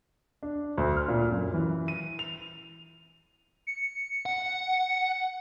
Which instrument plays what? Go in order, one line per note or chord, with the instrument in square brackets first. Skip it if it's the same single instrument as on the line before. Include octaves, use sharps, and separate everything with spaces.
[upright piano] D4
D2
F6
A#2
F#2
E3
D#7
F7
[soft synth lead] C#7
[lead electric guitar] F#5